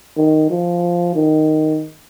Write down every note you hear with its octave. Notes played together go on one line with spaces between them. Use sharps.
D#3
F3
D#3